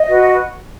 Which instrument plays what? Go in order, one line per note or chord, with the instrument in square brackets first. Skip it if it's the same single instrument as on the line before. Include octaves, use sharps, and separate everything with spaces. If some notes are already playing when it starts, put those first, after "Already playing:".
Already playing: [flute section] D#5
F#4 B4